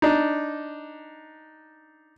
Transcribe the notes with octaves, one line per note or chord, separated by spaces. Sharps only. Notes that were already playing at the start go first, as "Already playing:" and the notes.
D4 D#4